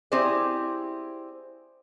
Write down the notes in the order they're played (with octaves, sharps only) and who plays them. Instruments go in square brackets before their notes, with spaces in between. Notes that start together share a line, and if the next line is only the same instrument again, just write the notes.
[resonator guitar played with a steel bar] C4 E4 G4 G#4 C5 D5